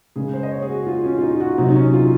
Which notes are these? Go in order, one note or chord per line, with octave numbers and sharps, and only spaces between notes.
C#3 G#3 G#4
C5
D#5
C#5
G#4
F#4
F4
C#4
F4
D#4
F4
F#4
C3 F#3 D#4
D#4
C#4
F4